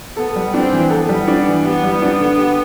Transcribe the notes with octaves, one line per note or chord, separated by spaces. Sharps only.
B3 A4
G3
C4 D4
E3
B3 A4
G3
D4
E3
B3 G4
G3
D4
D3
G4